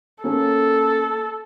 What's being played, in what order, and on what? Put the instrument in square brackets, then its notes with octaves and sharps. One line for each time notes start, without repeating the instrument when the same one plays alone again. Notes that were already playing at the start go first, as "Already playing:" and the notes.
[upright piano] A#3 C#4 [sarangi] A4